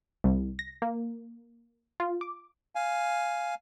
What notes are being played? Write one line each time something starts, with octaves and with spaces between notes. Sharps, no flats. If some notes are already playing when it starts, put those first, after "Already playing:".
C2
A#6
A#3
F4
D6
F5 G#5